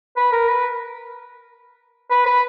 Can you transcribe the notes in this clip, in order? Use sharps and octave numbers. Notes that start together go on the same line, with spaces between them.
B4
A#4
B4
B4
B4